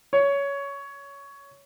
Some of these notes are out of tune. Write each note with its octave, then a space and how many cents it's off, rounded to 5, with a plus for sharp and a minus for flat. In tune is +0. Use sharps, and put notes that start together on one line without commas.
C#5 +15